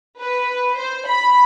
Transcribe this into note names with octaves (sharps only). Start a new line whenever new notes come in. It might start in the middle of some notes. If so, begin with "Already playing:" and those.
B4
C5
B5